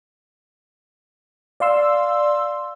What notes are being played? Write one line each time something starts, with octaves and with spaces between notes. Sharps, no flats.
D5 F5 C6 E6